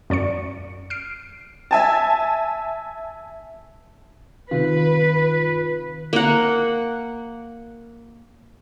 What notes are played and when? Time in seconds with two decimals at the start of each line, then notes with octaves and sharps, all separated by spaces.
0.10 F#2 D5 C#6 C#7
0.90 F6 C7 D7
1.71 E5 G#5 A5
4.51 C3 D#3 F4 B4
6.13 A#3 F#5